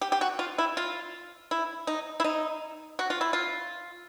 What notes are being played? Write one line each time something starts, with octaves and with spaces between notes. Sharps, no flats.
G4
G4
F#4
F4
E4
F4
E4
D#4
E4
D#4
F#4
F4
E4
F4